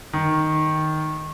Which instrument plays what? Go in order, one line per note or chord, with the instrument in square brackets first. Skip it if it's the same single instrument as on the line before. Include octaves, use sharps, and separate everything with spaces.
[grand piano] D#3